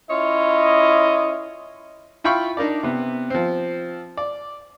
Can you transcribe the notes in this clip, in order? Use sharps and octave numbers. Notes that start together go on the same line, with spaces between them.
C#4 E4 F4 C#5 D#5
E4 F4 F5 G5 B5 C#6
D4 D#4 A#4 D5
C3 B3
F3 C4
D5